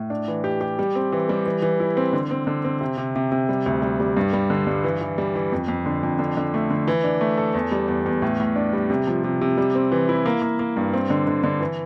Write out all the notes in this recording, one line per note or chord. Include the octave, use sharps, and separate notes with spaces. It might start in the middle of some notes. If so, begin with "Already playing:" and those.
Already playing: A2
D4
E3
G4
G4
G3
C4
E3
G3
E3
E3
E4
C4
D3
C4
D3
C4
C3
C3
C3
C3
G3
D2
G3
G3
G2
G3
D3
G2
E3
E3
G3
E3
F2
F2
D3
F2
D3
D3
A3
D3
E3
D4
A3
A4
E2
G3
E2
E2
A2
A2
D4
G3
C3
F3
C3
C3
G3
C4
E3
E4
A#3
A#3
A#3
G2
C4
D3
D3
D3
E3